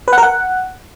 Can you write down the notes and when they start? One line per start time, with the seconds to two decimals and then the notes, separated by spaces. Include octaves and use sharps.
0.08 B4
0.13 F#5
0.18 A#4
0.23 F#5